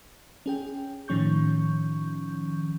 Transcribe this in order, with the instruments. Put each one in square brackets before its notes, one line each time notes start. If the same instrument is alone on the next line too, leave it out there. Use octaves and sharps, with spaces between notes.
[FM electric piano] C#4 G#4 G5
A2 D#3 F3 C#4 C#6 G6